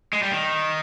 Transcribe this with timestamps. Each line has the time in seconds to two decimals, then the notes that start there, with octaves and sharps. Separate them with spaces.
0.13 G#3
0.23 G3
0.32 D#3